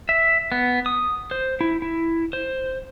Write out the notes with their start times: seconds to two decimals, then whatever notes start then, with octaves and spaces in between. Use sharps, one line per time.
0.09 E5
0.52 B3
0.86 D#6
1.31 C5
1.61 E4
1.82 E4
2.33 C5